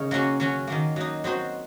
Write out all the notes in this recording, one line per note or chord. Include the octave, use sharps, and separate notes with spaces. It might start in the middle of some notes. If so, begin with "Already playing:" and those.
Already playing: C#3 D#4 A#4 C#5
F#3 A#3 C#4 F#4
F#3 C#4 F#4
D#3 F#3 A#3
F#3 A#3 D#4
F#3 C4 D#4 F#4 C5